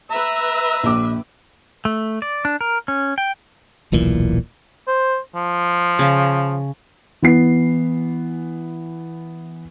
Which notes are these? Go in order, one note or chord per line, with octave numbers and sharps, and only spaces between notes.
B4 E5 A#5 E6
A#1 D6
A3
D5
D4
A#4
C#4
G5
D#1 B1 A#2 E3
C5
F3
C#3 A5
E3 B3 C7